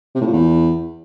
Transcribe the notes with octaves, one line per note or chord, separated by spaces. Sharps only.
C3
A2
A#2
E2